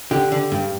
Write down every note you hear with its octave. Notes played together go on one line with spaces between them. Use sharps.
D3 G4
D3
G2